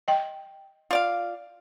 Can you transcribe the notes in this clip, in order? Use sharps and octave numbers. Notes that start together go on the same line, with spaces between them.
D#5 G5
F4 D5 F5